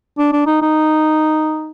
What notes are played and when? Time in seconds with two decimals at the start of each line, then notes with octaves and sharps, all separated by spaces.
0.18 D4
0.33 D4
0.47 D#4
0.62 D#4